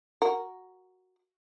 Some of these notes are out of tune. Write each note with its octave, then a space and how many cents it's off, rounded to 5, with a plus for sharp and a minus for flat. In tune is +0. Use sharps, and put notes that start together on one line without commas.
F#4 +0 A#4 +0